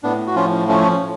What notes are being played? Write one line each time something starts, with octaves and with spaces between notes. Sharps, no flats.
A2 B3 D4
F#4
F3 C#4 F4
F3 A3 C#4
A2